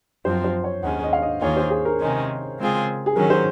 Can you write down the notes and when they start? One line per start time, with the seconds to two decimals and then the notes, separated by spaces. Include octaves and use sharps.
0.25 F#2 F3 C4 C5
0.44 C5
0.64 C#5
0.83 D#2 D#3 G#3 C#4 F#5
1.03 D#5
1.13 F5
1.22 D#5
1.41 D#2 D#3 A#3 F4 G#4 C#5
1.57 C5
1.70 G#4
1.85 A#4
2.00 C3 D#3 G#3 C#4
2.58 C#3 G#3 C4 F4 G#4
3.06 G#4
3.16 D#3 F#3 C#4 A#4
3.30 C5